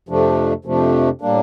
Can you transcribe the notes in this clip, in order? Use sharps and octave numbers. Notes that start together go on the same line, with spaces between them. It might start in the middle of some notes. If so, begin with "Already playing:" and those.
F2 C3 F3 A3 D4
F2 C3 F3 A3 D4
A2 G3 A#3 D4